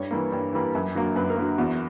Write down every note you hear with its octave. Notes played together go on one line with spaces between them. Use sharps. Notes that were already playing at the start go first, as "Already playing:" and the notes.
Already playing: G2 C#5
E3 G3 A#3
G2
E3 G3 A#3
F#2
D3 F#3 A#3
F#2 B4
A#4
D3 F#3 A#3
E2 F#4